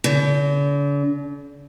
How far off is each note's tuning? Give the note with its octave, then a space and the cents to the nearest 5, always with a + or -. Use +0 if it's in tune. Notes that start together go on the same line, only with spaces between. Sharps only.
D3 -45